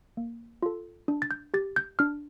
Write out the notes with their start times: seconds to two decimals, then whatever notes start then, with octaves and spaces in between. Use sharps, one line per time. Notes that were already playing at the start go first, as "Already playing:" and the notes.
0.17 A#3
0.63 F4 A4
1.08 D4
1.22 A6
1.31 G6
1.54 G4 A6
1.76 G6
1.99 D4 F6